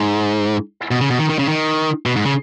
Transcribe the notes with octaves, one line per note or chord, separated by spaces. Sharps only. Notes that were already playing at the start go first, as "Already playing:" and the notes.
Already playing: G#2
B2
C#3
B2
D#3
D#3
C#3
D#3
B2
G#2
C#3